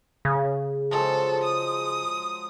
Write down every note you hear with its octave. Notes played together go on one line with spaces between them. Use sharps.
C#3
F3 F#3 G#3 A4
D#6